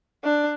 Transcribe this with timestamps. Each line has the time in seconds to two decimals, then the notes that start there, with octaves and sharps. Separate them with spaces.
0.24 D4